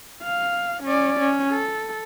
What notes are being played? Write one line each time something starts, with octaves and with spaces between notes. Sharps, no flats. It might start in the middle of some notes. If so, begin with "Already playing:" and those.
F5
C#4 D5
C#4
A4